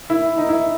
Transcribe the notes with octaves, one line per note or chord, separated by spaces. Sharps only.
E4
D#4
E4